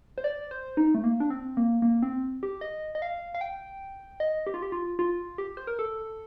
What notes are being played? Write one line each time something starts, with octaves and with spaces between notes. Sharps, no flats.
C5
D5
C5
D#4
A3
A#3
D4
C4
A#3
A#3
C4
G4
D#5
D#5
F5
F5
G5
D#5
G4
F4
G4
F4
F4
G4
C5
A#4
A4